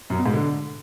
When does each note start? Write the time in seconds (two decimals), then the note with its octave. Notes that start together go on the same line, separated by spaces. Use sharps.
0.10 F#2
0.18 B2
0.26 G#2
0.33 D3